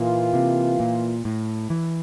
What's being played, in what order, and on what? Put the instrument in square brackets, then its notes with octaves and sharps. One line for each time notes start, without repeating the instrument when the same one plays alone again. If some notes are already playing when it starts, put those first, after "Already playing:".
Already playing: [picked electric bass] A#2 [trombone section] E3 A#3 F4
[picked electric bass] C3
A#2
A2
E3